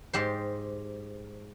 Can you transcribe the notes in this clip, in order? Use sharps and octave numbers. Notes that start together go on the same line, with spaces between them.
G#2 G4 C5